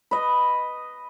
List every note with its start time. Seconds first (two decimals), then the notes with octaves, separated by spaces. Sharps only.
0.11 B4 D#5